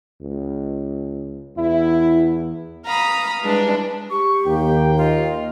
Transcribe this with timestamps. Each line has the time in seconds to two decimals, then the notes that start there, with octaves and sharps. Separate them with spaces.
0.21 C#2
1.57 E2 E4
2.86 F5 A#5 B5 D#6
3.42 E3 G3 G#3 D4
4.11 G4 C#6
4.47 D#2 A#3 G5
4.98 F4 D#5